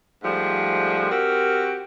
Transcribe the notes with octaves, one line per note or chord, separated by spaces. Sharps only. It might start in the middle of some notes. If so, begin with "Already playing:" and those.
G#2 F3 G3 A3
C4 F#4 G4 A#4